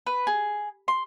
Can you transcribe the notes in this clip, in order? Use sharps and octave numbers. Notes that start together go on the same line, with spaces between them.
B4
G#4
C6